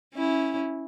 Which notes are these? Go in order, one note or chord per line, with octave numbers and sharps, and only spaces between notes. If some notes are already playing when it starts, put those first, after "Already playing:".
C#4 E4